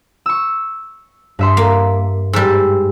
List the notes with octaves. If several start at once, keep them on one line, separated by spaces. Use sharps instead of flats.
C#6 E6
G2 E5 C6
A#3
G#2 G3 E6